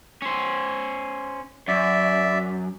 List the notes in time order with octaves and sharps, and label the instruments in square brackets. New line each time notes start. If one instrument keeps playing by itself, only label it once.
[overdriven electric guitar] C#4 C5
[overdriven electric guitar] F#2 [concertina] D5 E5